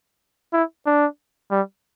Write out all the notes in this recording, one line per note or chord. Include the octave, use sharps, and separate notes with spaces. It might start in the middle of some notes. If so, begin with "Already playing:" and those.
E4
D4
G3